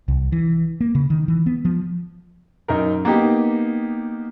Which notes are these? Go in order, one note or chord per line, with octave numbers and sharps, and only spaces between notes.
C2
E3
A#3
C#3
D#3
E3
B3
F3
F#2 D#4 A#4
A#3 B3 D#4 G4